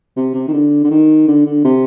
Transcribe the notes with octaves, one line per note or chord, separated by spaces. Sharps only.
C3
C3
D#3
D3
D3
D#3
D3
D3
C3